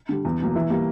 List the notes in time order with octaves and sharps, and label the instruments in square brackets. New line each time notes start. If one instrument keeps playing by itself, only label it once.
[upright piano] D3 G3
E2
B2 F#3 A#3
E3
G3 A#3